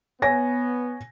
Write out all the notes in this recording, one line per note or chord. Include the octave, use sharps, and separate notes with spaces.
B3 C#5 G#5 A#6